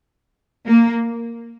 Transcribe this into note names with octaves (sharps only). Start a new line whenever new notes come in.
A#3